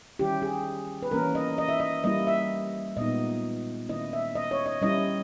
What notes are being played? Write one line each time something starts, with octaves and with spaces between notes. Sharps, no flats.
D#3 G3 C#4 E4 G4
G#4
B4
E3 A#3 C#4 A#4
D#5
D#5
E5
D#5
G3 A#3 E4 D#5
E5
A#2 G#3 B3 D#4 D#5
D#3 A#3 C#4 E4 D#5
E5
D#5
C#5
D#5
G3 C#4 E4 D#5